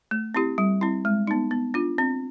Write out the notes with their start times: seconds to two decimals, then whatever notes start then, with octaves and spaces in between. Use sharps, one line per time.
0.11 A3
0.35 C4 E4 G4
0.58 G3
0.81 C4 E4
1.05 G#3
1.27 B3 D#4
1.51 B3
1.74 D4 F4
1.98 C4